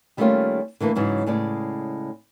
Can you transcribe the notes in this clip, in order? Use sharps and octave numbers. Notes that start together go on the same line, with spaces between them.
D#3 G3 A3 A#3 C#4 F4
D3 E3 A3 A#3
G#2 C#3 E3 F#3
A2 C#3 G#3 D5